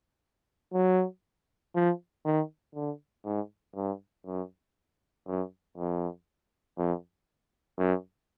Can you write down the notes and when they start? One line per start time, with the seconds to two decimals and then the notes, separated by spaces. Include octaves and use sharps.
0.74 F#3
1.75 F3
2.25 D#3
2.75 D3
3.25 G#2
3.76 G2
4.26 F#2
5.27 F#2
5.77 F2
6.78 F2
7.78 F#2